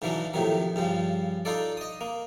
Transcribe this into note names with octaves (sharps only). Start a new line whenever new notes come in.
G#2 C#3 E3 F#3 D4
F2 A2 C3 D#3 F#3
G2 C#3 F3
D4 D#4 F4 A4 D5
D#5 D#6
A#3